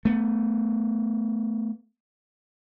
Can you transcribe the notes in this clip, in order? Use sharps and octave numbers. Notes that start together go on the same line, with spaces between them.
A3 B3